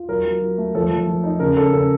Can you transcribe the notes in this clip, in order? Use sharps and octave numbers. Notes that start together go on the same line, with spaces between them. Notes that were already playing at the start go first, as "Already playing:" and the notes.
Already playing: F4
F#3 A#4
F#3
F#3
A3
F3 A4
F3
F3
D#4
C#3 A#4
C#3 A4
C#3 A4